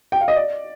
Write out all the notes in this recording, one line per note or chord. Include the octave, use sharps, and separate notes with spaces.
G5
F5
D#5
D5